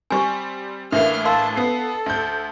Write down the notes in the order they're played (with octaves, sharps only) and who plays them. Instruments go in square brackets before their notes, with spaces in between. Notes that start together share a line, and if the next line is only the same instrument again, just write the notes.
[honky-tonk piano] G3 C4 [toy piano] G#5 C#6
[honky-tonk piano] A2 E3 A#3 [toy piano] D4 E5 [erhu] F6
[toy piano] F5 C6 E6 [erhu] A5
[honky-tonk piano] B3 C7 [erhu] A4
[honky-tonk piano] D2 G6